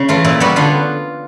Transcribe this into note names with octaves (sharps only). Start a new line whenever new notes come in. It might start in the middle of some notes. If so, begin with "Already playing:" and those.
Already playing: C#3
E3 A3 F4
A#2 E4
G3 B3 F#4
D3 F4